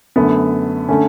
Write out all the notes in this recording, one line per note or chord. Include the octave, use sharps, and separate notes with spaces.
F#2 D3 A3 B3
D3 A3 C#4